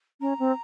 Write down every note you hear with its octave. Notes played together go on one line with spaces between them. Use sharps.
C#4 A#5
C4